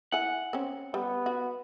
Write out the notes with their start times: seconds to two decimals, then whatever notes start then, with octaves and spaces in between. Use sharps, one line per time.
0.12 E4 F#5 G#5
0.53 C4 C#4
0.94 G3 B3
1.26 F#4